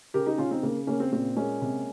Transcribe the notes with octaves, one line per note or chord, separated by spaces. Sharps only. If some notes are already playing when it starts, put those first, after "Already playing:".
C#3 G4 A#4
D#4 G4
C#3 C#4 F4
C4 D#4
C#3 A#3
C#3 A#3 C#4
C4
A#2 C4
G#3 A#3 C#4
C3